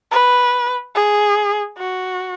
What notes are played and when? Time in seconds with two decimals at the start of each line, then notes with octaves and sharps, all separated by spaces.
0.11 B4
0.95 G#4
1.78 F#4